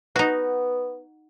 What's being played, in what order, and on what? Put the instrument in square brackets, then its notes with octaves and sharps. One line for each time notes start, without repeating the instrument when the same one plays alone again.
[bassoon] B3 [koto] D#4 F#4